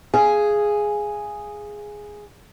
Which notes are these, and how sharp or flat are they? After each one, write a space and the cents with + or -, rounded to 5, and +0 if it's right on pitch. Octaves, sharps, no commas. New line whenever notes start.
G#4 +0 F5 -25 G#5 +0